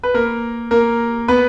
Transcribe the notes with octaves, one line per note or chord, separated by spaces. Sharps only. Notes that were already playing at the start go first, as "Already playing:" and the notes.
B4
A#3 A#4
A#3 A#4
B3 B4